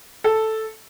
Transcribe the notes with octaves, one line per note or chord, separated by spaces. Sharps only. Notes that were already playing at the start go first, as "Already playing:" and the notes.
A4